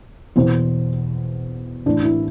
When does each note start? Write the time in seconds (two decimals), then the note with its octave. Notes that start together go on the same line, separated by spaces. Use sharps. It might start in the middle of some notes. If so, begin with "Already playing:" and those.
0.36 E2 B2 C5
1.86 A2 E3 D4
2.04 E4